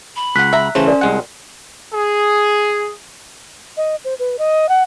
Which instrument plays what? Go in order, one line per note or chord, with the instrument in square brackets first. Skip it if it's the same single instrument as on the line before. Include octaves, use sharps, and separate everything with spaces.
[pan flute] B5
[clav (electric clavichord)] C#2 F#5 [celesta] F#6 B6
[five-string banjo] E5 A#5
[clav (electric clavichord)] C#3 E3 A3 [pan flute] C#4 [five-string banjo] C5
[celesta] A#4 D5
[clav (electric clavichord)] C2 G#3 F#5
[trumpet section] G#4
[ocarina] D#5
C5
B4
D#5
F#5